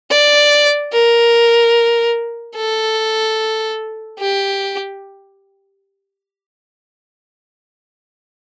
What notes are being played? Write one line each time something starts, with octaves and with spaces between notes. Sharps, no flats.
D5
A#4
A4
G4